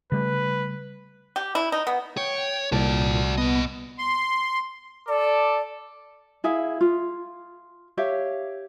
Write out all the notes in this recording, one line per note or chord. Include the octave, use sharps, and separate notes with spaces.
C#3 G3 A3 B4
G4
E4
D#4
B3
C#5 G5
C2 A#2 F#4 D5 A5
A#2 B3 D#5
C6
A4 D5 D6
E4 G#4 E5 F5
F4
G4 C#5 E5 F5